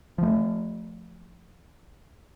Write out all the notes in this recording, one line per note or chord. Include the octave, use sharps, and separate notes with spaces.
F3 A3